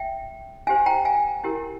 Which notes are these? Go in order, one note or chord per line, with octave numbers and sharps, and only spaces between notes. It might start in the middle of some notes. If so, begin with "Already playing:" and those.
Already playing: E5 G5
C#4 G4 C5 F5 G#5
G5 A#5
F5 G#5
C#4 E4 G4 A#4